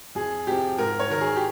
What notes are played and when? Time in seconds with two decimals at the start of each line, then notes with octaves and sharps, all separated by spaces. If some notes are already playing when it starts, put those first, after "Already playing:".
0.15 F2 G#4
0.47 C3 F3 G4
0.78 G#2 A#4
0.99 C#5
1.10 D#3 A#4
1.21 G#4
1.36 G4